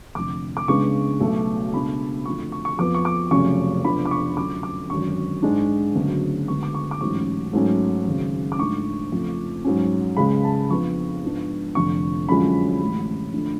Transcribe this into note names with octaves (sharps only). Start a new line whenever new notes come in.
F1 F2 D3 D6
D6
C#2 C#3 G#3 B3 D4 C#6
B1 B2 A3
C#2 B2 A3 D4 B5
F2 D3 F3 A3 C#6
C#6
C#6
F2 F3 B3 D6
C#6
D6
F1 F2 C#3 F#3 C#4 C#6
F1 F2 F3 B3 D4 B5
D6
C#6
F#2 D3 F3 D6
D6
G#1 F#2 D3 C#6
G#2 G#3 D4
D2 C#3 F#3 B3 D4
D2 D3 G#3 B3 C#6
D6
C#6
D6
A1 G#2 F#3 C#4 C#6
G#2 F#3 A3 C#4
G#1 F#2 C#3
D6
G#2 F3 A3 D4 C#6
F2 C#3 F3 A3
G#2 F#3 C#4
C#2 C#3 G#3 B5
A5
F2 F3 B3 D4 C#6
G#2 F3 G#3 B3 D4
F1 F2 D3 C#6
F#2 D3 F3 G#3 C#4 B5
A1 A2 G#3
D3 F3 A3 D4